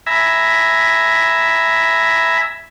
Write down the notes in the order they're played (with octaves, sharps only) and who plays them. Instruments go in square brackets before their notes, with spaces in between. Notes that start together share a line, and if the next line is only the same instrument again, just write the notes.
[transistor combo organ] E5 G#5 A#5 B5